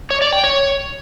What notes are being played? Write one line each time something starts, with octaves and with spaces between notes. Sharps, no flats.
C#5
D5
G5
C#5